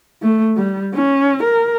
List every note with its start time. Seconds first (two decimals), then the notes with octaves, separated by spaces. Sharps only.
0.22 A3
0.57 G3
0.94 C#4
1.44 A#4